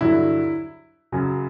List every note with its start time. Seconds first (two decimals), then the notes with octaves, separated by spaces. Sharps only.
0.01 G2 D3 F#3 E4
1.12 F#2 C#3 F#3